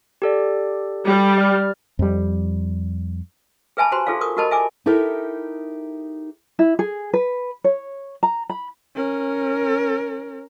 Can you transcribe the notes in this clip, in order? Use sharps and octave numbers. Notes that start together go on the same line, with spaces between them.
G4 A4 D5
G3
D5 F6
F2 G3
G#4 B4 E5 G#5 A5 B5
F#4 G4 C5 A#5 C6
F4 G#4 A4 D5 F5
A#4 C#6 D#6
F#4 G4 A#4 D#5 A5 B5
E5 G#5 D6
D#4 E4 G4 A4 A#4 E5
E4
G#4
B4
C#5
A#5
B5
C#4 A#4